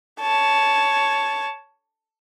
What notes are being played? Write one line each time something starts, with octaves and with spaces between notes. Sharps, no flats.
C#5 A5